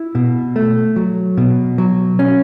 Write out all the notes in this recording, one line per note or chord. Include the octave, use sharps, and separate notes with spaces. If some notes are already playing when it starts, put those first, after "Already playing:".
Already playing: E4
B2
A3
F#3
B2
F#3
C#4